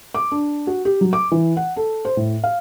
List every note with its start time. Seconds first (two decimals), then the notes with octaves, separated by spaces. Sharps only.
0.15 D6
0.32 D4
0.67 F#4
0.85 G4
1.01 F#3
1.13 D6
1.32 E3
1.57 F#5
1.77 A4
2.05 C5
2.17 A2
2.44 F5